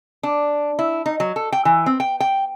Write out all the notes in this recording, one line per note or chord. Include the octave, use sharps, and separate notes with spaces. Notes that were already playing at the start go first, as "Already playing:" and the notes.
D4
E4
D#4
F#3
A4
G5
E3
C4
G5
G5